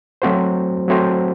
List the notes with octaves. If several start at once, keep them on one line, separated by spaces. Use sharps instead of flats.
F#3 A3 C4 F#4 C5
F#3 A3 C4 F#4 C5